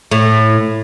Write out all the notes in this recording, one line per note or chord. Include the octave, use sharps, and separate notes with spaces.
A2